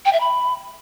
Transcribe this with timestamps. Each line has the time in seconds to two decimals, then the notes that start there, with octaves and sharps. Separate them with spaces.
0.05 G5
0.13 E5
0.20 B5